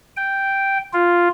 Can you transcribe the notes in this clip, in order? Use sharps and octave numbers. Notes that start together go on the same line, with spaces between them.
G5
F4